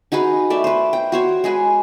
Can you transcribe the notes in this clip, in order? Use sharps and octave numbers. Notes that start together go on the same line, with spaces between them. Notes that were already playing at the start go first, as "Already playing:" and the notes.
D#4 F#4 G#4 B4
A3 D5 E5
B4 C5
G5
F#4 C5 C#5
G#3 G#4 B4